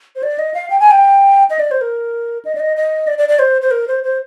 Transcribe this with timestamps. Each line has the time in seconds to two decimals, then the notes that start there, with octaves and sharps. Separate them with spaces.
0.16 C5
0.23 D5
0.39 D#5
0.54 F5
0.70 G5
0.80 G#5
0.91 G5
1.50 D#5
1.59 D5
1.71 C5
1.81 A#4
2.45 D#5
2.55 D5
2.60 D#5
2.77 D#5
3.07 D5
3.18 D5
3.29 D5
3.39 C5
3.62 C5
3.71 A#4
3.88 C5
4.04 C5